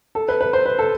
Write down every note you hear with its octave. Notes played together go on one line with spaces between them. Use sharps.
A4
B4
B4
C5
B4
A4